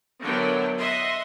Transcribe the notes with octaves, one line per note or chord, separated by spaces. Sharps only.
D3 F#3 B3 E4 A#4 G5
D#5 E5 F#5 C6